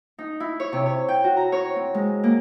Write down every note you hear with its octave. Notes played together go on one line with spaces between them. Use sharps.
D#4
E4
C#5
C3
C#5
G5
F#4
A#5
C#5
C4
G#3
A#3